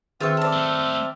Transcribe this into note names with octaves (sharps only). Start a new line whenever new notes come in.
D#3 C4 F4 G#4 E5 G5 C#6 F6
A4 D5
A3 F4